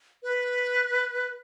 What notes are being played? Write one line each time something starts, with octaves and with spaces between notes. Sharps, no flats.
B4